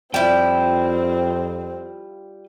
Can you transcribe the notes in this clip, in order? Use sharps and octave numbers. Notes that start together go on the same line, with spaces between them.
F2 G3 C4 E4 F4 G5